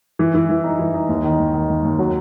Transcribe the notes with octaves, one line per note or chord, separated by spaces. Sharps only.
E3
E3
E3
D#4
E3
D#4
D#2
D#3
D#2
D#3
D#2
D#2
F#3